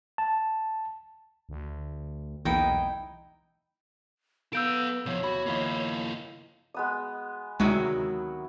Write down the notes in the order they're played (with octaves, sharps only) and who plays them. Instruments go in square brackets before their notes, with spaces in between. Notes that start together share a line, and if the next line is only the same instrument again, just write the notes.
[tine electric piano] A5
[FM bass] D2
[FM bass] B1 [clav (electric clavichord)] E2 A#3 B3 [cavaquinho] D#4 E4 G5
[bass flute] B3 [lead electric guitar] A4 F5 [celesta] E6 G6 D7
[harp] E2 [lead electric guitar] C3 F3 [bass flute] C#5
[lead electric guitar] F#4 [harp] B5
[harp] D#3 F3 [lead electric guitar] A#3 E4
[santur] G#3 B3 D#6
[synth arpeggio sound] D2 G#3 [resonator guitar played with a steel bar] C3 D#3 F#3 [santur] E4 F#4